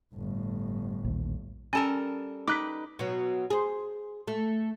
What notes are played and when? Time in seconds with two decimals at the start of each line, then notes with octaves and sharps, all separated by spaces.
0.15 G1 A2
1.04 A#1 D#2
1.73 G3 C#4 A4 A#4 G#5 A5
2.48 D#4 B4 G5 D6 F#6 B6
2.99 B2 F#3
3.50 G#4 C5
4.27 A3